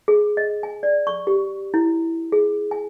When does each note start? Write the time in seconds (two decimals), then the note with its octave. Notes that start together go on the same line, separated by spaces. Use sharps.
0.08 G#4
0.37 D#5
0.63 G#5
0.83 D5
1.07 C#6
1.27 G4
1.74 E4
2.32 G#4
2.71 G#5